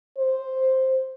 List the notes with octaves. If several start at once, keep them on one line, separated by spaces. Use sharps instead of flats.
C5